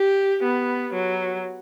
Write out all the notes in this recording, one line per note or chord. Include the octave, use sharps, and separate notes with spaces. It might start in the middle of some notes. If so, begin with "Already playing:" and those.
Already playing: G4
B3
F#3